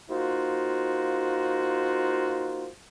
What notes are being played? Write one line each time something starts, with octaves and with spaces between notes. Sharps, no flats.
A#3 D#4 F4 F#4 C5